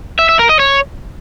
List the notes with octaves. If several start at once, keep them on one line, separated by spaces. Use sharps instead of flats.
E5
E5
A#4
D#5
C#5